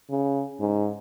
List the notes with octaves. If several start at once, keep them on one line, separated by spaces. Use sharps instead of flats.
C#3
G#2